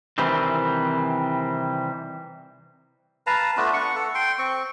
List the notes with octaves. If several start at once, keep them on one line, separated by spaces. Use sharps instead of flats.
C3 D#3 E3 G3 C4
B4 F5 A5 A#5
A3 B3 D4 F4
F#5 C#6
A4
G5 C6
C4 C#6